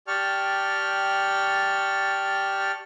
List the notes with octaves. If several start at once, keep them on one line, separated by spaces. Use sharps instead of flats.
G4 D5 G5 A5 C#6 F6